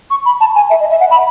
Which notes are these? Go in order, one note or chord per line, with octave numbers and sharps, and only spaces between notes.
C#6
B5
A5
G#5
E5
D#5
E5
F#5
B5